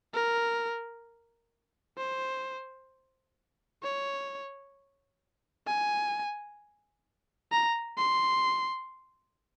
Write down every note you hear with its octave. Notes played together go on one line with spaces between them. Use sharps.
A#4
C5
C#5
G#5
A#5
C6